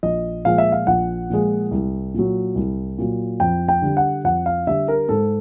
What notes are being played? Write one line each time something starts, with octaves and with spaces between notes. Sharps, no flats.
A#1 D#5
A#2 F3 G#3 F5
E5
F5
A#1 F#5
A#2 F3 G#3
C2
A#2 F#3
C2
A#2 F#3
F2 G5
G5
D3 G3
F#5
F2 F#5
F5
D3 G3 E5
A#4
G#2 A4